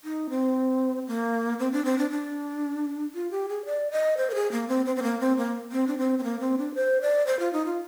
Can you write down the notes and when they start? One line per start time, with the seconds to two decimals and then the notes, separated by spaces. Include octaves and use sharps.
0.04 D#4
0.30 C4
1.07 A#3
1.59 C4
1.72 D4
1.85 C4
1.98 D4
2.11 D4
3.15 F4
3.31 G4
3.49 G#4
3.65 D5
3.91 D#5
4.17 C5
4.30 A#4
4.35 G#4
4.52 A#3
4.69 C4
4.86 C4
4.96 C4
5.03 A#3
5.20 C4
5.37 A#3
5.72 C4
5.87 D4
5.98 C4
6.19 C4
6.24 A#3
6.40 C4
6.58 D4
6.75 C5
7.02 D5
7.27 C5
7.39 F4
7.53 D#4
7.66 F4